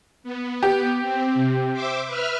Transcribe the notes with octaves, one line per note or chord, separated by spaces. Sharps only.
B3
G4
C4
C3
C5 E5 D6
B4 E5 F6